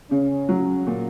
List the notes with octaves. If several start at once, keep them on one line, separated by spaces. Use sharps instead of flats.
C#3 C#4
F#3
A#2